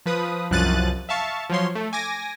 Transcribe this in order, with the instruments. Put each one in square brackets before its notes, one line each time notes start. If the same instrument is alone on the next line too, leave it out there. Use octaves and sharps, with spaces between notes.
[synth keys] F3 B4 D#6
C2 F#2 F3 F#6 A6 D#7
E5 F5 A5 C#6
F3 F#3 C#5 C6
A3
G#5 D6 A#6